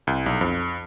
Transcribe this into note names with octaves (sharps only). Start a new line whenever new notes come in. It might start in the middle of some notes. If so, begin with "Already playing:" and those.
C2
B1
F2